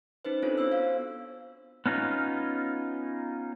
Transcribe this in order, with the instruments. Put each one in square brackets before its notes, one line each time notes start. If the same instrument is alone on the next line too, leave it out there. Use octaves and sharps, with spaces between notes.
[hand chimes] C#4 D#4 B4 C5
C4 D4 F4 A4 C#5
B3 C5 E6
F#4 C5 F5
[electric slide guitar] B3 C#4 D#4 F4